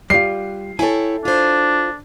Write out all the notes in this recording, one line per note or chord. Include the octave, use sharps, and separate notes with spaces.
G3 F4 C7
E4 G4 A4 C#5 G#5
D4 F4 C5